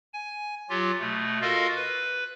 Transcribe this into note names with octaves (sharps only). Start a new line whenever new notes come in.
G#5
F#3 F4 G4
B2 A3
F4 F#4 A4 A#4 D#5 F5
B4